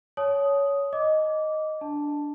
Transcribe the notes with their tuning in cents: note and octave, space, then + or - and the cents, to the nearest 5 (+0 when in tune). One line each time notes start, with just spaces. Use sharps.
C#5 +15 A5 -30 D#6 +0
D#5 +0 D6 -15
D4 -5 A5 +0